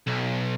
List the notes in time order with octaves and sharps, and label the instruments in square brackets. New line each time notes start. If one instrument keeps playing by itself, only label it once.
[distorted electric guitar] B1